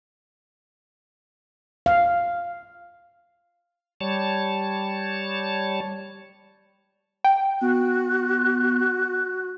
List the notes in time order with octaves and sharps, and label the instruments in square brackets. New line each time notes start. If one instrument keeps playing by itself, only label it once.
[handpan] F5
[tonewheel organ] G3 C#5 A5
[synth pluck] G5
[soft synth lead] B3 [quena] F#4 [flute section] F#6